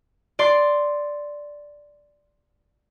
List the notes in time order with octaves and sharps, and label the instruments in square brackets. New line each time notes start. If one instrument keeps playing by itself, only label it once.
[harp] D5 C6